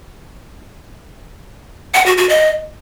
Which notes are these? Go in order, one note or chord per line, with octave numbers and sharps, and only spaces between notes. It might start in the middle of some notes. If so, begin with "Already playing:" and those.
F#5
F#4
F#4
D#5